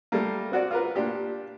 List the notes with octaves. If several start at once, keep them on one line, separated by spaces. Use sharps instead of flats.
G3 A3 A#3
C4 F#4 D5
F4 A#4 B4
A#2 D4 G4